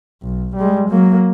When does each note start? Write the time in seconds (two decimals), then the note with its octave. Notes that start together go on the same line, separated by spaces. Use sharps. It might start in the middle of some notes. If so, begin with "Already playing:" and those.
0.23 B1
0.55 G3 G#3
0.89 F#3 A#3